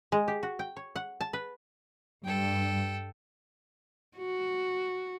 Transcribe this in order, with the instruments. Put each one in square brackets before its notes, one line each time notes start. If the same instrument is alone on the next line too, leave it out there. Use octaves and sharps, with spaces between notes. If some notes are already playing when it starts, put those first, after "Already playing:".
[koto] G#3
G4
F#4
G5
C#5
F#5
A5
B4
[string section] G2 [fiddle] A4 G5
[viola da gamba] F#4